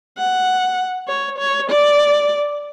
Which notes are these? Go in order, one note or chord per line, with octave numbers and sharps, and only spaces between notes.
F#5
C#5
C#5
D5